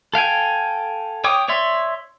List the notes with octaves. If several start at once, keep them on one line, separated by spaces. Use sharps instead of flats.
A4 F5 G5 G#5
C#5 G5 D6 D#6
C#5 D5 E5 C6